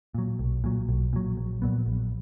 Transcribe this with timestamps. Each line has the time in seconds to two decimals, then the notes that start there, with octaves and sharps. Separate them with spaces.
0.14 A#2 F#3
0.39 B1
0.64 A#2 F#3
0.89 B1
1.13 A#2 F#3
1.37 A#1
1.62 A#2 F#3 B3
1.86 A#1